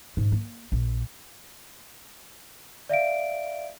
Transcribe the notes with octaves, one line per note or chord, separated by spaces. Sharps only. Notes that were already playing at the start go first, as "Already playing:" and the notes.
G#2
A#3
A#1
D5 E5 F5 D7